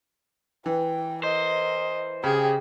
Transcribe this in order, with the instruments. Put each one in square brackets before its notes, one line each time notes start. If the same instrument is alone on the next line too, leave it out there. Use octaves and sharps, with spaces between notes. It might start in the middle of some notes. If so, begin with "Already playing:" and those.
[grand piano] E3 [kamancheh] G5
[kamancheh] A#4 [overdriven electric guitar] C5 [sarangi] D#5
[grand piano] C#3 [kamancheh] G4 G5 [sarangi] G#4